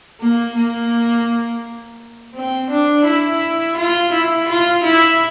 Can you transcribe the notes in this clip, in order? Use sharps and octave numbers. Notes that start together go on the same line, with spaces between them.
A#3
A#3
C4
D4
E4
F4
E4
F4
E4